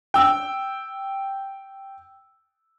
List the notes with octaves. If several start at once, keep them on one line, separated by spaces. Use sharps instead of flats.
G5 E6